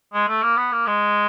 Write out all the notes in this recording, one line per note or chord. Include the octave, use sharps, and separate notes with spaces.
G#3
A3
A#3
B3
A#3
G#3